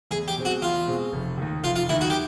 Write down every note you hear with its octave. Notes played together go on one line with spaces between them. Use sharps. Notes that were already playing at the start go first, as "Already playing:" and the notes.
E2 G#4
G4
B2 G#3 C4
F#4
E2 F4
B2 G#3 C4
F1
D#2 D#3
F1 F4
F4
D#2 D#3 E4
F#4
G4